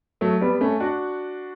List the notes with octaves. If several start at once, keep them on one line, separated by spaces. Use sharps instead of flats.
F#3 A3
G3 B3
A3 C#4
D4 F#4